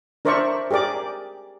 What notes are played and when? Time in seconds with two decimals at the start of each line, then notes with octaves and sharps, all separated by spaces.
0.25 D4 A#4 C5 D5 E5 C#6
0.71 G4 G#4 A#4 D5 D6